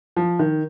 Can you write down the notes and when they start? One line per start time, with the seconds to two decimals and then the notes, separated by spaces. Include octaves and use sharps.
0.16 F3
0.39 D#3